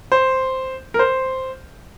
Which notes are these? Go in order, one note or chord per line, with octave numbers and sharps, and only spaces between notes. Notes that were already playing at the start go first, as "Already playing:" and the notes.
C5
A#4
C5